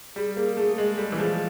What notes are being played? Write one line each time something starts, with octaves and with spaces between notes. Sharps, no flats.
G3 G#4
A#3 G#4
A3 G#4
G#3 G#4
G3 A4
E3
F3 G#4